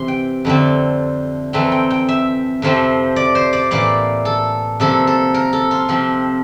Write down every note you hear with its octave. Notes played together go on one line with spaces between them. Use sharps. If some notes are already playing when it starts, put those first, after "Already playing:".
Already playing: C3 E3 C6
G5
F2 D3 A3 C4
F2 E3 A3 C4 A#5
G5
G5
E5
F2 C3 F3 A3 C4
D5
C5
D5
A2 E3 A#3 D5
A4
C3 F3 A#3 A4
A4
A#4
A4
F4
C3 F3 C4